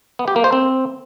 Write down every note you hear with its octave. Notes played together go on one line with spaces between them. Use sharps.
B3
G4
A#3
C5
C4